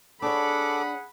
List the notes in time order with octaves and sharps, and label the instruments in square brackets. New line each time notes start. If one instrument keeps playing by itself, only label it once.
[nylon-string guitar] D4 C#5 [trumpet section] G#4 F#5 [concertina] A4 D6 [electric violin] B5